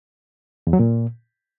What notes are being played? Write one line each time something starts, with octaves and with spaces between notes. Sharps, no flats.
E2
F#3
A#2